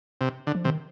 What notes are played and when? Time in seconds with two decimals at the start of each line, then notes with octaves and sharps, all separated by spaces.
0.21 C3
0.47 D3
0.55 F3
0.64 C3 D#3